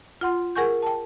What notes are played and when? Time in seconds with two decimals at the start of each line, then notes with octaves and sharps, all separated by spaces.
0.21 F4 F#5 C6
0.55 G#4 A#4 F#5 G#5 C#6 G6
0.82 G5 A5